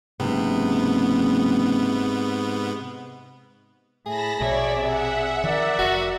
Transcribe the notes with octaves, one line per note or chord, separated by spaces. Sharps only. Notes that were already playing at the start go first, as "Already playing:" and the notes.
F#1 G#2 C3 B3
A2 G#4 A5 B5 A#6
A#1 B2 C#5 D5 E5
C3 E5 F#5
D#3 F3 A#4 D5
F1 F#4